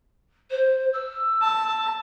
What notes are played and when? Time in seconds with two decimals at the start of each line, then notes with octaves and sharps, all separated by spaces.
0.50 C5
0.93 E6
1.41 A5